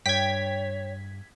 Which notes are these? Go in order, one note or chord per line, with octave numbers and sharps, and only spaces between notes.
G2 C#5 G5 G#6 B6